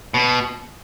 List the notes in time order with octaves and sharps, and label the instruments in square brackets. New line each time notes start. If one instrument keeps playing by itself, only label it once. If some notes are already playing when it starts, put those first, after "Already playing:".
[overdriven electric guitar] B2